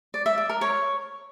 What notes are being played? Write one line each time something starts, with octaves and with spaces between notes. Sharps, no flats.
D5
E5
D5
A#4
C#5